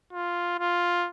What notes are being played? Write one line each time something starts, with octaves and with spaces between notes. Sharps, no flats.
F4
F4